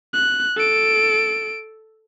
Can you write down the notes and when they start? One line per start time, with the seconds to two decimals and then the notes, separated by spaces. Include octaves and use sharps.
0.13 F#6
0.56 A4 D7